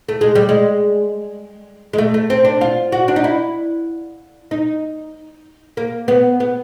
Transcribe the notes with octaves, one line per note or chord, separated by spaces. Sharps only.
A3
G#3
G3
G#3
G#3
A3
A3
C4
D4
F4
F#4
D4
D#4
E4
D#4
A#3
B3
B3